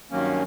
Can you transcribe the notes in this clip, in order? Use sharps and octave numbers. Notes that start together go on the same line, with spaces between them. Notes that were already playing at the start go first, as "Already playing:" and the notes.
G2 D#3 F#3 A#3 C#4